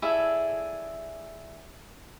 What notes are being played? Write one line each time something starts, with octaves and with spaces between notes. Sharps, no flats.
E4 G#4 A4 D5